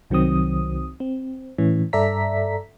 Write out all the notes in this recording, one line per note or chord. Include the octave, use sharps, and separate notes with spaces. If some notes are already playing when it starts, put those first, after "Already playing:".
C2 D#3 F#3 C4 D#6
C4
A2 E3 C#4
G2 A4 D5 E5 A#5 B6